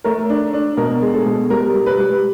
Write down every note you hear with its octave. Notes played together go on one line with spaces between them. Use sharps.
A3 A#4
D4
D4
B2 A#4
G#3
A4
B2
G3 A#4
G3
B4
G3